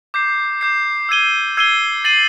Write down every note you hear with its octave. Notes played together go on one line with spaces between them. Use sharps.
D6 G6 C7
D6 G6 C7
E6 G#6 C7 D#7 G7
E6 G#6 C7 D#7 G7
A6 C7 D#7 F#7